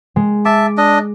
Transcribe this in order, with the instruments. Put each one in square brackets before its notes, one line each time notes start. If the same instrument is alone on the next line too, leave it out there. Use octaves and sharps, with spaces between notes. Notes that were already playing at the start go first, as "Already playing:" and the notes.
[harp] G#3
[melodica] E5 A5 [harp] D6
[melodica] D4 D#5